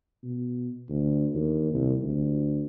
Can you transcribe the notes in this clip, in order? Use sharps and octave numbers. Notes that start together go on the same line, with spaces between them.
B2
D2
D#2
C2
D2